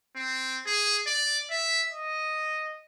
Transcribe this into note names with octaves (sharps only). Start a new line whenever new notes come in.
C4
G#4
D5
E5
D#5